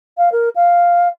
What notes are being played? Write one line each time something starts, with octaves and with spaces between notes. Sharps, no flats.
F5
A#4
F5